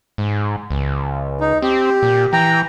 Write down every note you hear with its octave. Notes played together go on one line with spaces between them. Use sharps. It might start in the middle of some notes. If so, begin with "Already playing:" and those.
G#2
C#2
D#4
C4 G4
A#2
E3 G5 A#5